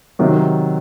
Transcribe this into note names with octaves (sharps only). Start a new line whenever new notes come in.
C3 D#3 F#3